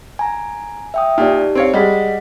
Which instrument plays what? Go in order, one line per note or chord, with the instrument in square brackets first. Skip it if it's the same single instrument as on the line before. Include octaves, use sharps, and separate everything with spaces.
[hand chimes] G#5 A#5
E5 G5 D#6
[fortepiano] A#2 [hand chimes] D#4 G4 D5
[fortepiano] C4 C#5 F5
[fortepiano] G3 G#3 [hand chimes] D#5 F#5 B6